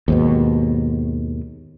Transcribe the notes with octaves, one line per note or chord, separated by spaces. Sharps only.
D#2 G#2 B2